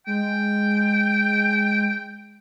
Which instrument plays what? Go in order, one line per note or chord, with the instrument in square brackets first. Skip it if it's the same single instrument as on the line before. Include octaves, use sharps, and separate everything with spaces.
[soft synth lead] G#3 [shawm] G5